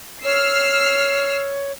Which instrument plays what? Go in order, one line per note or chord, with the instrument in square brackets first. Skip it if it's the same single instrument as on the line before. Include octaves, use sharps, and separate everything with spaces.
[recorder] C#5 [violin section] E6 F6 C7